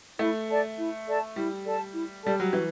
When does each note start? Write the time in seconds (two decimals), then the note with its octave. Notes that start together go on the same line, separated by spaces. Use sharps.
0.19 A3 E4
0.49 A4 D5 A5
0.78 E4
1.07 A4 D5 A5
1.36 G3 E4
1.65 A4 D5 A5
1.94 E4
2.23 G3 A4 D5 A5
2.40 F#3
2.53 E3 F#4